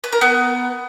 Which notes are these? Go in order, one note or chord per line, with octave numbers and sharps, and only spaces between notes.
B4
A#4
B3